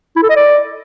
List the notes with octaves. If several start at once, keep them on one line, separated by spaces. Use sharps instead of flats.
E4
A4
D#5
D5